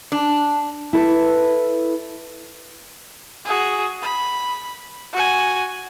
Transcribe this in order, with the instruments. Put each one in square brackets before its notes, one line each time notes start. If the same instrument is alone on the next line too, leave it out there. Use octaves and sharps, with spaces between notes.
[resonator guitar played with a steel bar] D4
[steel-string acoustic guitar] E4 A4 B4
[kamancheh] F#4 G#4
B5
F#4 G#5